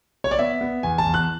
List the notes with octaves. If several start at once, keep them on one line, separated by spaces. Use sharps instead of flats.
C#5
D5
B3 E5
B3
E2 G#5
A5
E2
F#6